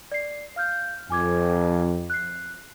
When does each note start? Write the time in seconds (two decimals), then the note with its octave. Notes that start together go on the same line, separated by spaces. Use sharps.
0.12 D5 C7
0.56 F5 F6 G6
1.10 F2 G#5 D6 G#6
2.10 F#6 C7